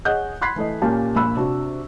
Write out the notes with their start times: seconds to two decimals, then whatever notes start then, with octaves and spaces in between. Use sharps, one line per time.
0.05 G#4 C#5 D#5 F#5 F#6 G6
0.41 B5 C6 F#6 G#6 B6 C7
0.56 E3 A3 D#5
0.82 A#2 A#3 C#4 G4 A5
1.16 A#1 A#2 B5 E6 F#6
1.37 C3 D4 F#4